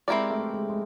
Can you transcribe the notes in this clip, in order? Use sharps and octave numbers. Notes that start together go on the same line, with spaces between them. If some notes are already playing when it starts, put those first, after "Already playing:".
G#3 C4 E4 G4 A#4 D5
A3
G#3
G#3